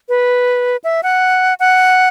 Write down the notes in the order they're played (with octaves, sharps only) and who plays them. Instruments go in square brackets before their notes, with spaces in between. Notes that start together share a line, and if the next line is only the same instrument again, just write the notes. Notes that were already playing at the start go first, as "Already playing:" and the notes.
[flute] B4
E5
F#5
F#5